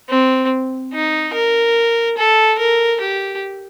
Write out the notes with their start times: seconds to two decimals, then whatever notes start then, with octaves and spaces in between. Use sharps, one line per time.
0.10 C4
0.93 D#4
1.34 A#4
2.18 A4
2.59 A#4
3.00 G4